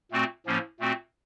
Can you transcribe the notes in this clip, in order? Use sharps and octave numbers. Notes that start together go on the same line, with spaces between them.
A#2 A3 C4 F#4
A2 F3 A#3 C#4
A#2 A3 C4 F#4